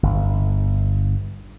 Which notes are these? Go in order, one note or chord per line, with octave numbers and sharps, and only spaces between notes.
G1